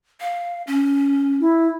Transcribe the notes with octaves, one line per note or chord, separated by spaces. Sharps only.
F5
C#4
E4